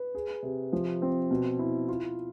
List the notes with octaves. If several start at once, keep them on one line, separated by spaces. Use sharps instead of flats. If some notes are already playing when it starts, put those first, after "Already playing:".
Already playing: B4
G#4
C3
F3
C4
B2
E4
F4